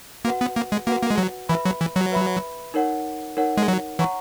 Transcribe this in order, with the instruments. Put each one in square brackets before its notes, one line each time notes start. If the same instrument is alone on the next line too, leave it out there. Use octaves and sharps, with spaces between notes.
[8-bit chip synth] A#3 [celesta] F#4 B4 F#5
[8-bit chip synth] B3
A#3
G#3
[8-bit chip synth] A#3 [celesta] F#4 B4 F#5
[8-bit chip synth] A#3
G#3
F#3
[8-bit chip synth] E3 [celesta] B4 E5 B5
[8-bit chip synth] F#3
E3
F#3
[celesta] B4 E5 B5
D#4 A#4 C#5 F#5
D#4 A#4 C#5 F#5
[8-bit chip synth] G#3
F#3
[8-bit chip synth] E3 [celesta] C#5 F#5 A#5 C#6